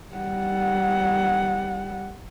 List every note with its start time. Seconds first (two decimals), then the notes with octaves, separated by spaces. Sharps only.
0.15 G3 F#5